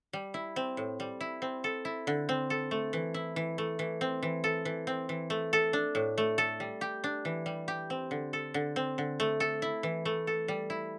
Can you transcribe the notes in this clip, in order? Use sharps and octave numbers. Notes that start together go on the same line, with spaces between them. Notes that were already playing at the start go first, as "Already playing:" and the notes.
G3
E4
C4
A2
G3
E4
C4
A4
E4
D3
C4
A4
A3
E3
E4
E3
A3
E3
C4
E3
A4
E3
C4
E3
A3
A4
D4
A2
A3
A4
G3
G4
D4
E3
G3
G4
C4
D3
A4
D3
C4
D3
A3
A4
E4
E3
A3
A4
G3
E4